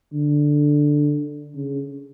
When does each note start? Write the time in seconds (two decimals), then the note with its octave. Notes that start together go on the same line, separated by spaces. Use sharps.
0.13 D3
1.55 C#3